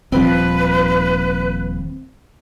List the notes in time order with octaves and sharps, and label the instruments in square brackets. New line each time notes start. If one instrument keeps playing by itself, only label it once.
[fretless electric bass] D#1 F3 [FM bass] C4 [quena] B4